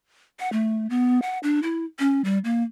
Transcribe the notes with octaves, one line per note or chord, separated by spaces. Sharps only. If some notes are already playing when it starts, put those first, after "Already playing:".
F#5
A3
B3
F#5
D4
E4
C#4
G3
A#3